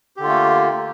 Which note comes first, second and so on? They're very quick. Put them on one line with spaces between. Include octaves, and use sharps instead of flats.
G4 D3 F4 A3 A#3